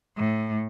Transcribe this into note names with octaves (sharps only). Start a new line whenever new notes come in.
A2